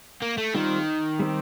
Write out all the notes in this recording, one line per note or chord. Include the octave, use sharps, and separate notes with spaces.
A#3
A3
D#3 G3 C4 F4 C5
G3 C4 G4